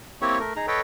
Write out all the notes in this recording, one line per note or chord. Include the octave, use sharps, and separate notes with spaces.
A#3 C4 E4 G4 C#5 C#6
A3 A#4
D#4 G#4 A#5
A4 B4 C#5 D#5 G5